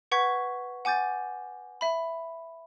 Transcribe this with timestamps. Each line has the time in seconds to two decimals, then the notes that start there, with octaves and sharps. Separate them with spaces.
0.12 B4 F#5 C#6 G#6 B6
0.85 F#5 G#5 D6 G6 A6
1.81 E5 B5